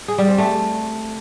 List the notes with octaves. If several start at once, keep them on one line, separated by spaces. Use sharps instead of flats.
G#4
G3
C4
A3